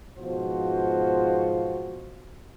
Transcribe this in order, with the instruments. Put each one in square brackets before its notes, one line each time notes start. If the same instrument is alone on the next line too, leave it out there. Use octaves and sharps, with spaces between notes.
[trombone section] G#2 B2 F3 F4 F#4 C5